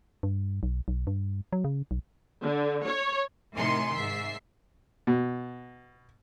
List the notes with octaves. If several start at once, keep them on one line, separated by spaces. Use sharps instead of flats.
G2
B1
B1
G2
F#3
C#3
B1
D3
C#5
A2 C3 D#3 G#5 C6 C#7
G#2 E5 C7
B2